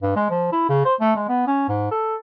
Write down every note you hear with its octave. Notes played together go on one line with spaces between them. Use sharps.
G2
G#3
F3
E4
C#3
C5
A3
G#3
B3
C#4
G#2
A4